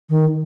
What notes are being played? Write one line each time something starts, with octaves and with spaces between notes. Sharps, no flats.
D#3